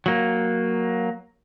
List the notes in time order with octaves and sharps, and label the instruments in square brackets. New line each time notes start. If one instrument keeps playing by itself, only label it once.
[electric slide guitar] F#3 A#3